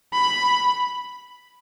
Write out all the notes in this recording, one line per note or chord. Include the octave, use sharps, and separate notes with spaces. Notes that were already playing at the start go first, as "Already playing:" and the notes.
B5